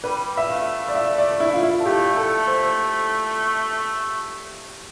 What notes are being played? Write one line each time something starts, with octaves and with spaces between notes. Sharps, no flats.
G3 B4
E5
A3 F5
D5
E5
D5
E4
F4
E4
A4
A3 G4
A4
C5